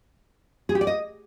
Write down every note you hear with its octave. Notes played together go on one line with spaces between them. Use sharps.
G#4
G4
D5
D#5